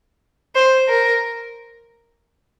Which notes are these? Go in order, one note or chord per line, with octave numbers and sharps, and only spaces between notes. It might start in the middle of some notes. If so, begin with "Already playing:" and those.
C5
A#4